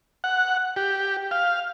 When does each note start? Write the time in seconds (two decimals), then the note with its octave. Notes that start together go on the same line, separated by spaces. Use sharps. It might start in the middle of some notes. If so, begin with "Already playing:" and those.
0.24 F#5
0.76 G4
1.31 F5